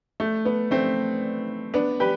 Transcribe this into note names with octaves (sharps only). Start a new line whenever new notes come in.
A3
B3
A3 C4
B3 D4
G4 B4